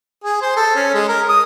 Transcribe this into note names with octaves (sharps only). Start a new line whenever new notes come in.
G#4
C5
A4
C#4
G#3
A#4
D#6